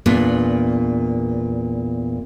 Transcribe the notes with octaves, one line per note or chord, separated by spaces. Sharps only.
E2 A#2 B3 D4